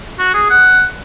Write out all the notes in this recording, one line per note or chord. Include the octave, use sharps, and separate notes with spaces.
F#4
G#4
F#5